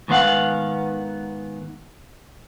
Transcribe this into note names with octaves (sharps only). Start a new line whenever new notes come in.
G#2 D#3 B3 C5 F5 F#5